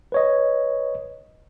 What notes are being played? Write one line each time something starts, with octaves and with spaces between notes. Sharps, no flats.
B4 C#5 D#5